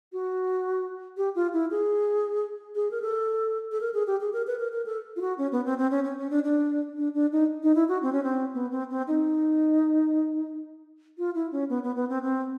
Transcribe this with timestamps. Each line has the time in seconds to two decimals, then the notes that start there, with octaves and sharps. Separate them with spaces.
0.13 F#4
1.17 G4
1.35 F4
1.53 E4
1.71 G#4
2.75 G#4
2.91 A#4
3.02 A4
3.72 A4
3.81 A#4
3.94 G#4
4.07 G4
4.20 G#4
4.33 A#4
4.47 B4
4.59 A#4
4.73 A#4
4.86 A4
5.16 F4
5.21 F#4
5.38 C#4
5.52 B3
5.65 C4
5.78 C4
5.91 C#4
6.04 C#4
6.18 C#4
6.30 D4
6.44 D4
6.97 D4
7.14 D4
7.32 D#4
7.63 D#4
7.75 E4
7.89 F#4
8.02 C4
8.13 C#4
8.23 C4
8.54 B3
8.71 C4
8.90 C4
9.08 D#4
11.18 F4
11.35 E4
11.52 C#4
11.70 B3
11.83 B3
11.96 B3
12.09 C4
12.23 C4